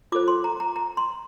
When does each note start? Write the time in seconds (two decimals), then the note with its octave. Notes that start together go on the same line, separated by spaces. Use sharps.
0.12 F4 A4 C5 D6
0.28 C6
0.44 A#5
0.60 A#5
0.76 A#5
0.97 C6